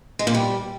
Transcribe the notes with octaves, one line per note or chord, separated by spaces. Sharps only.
G#3
A#2
G3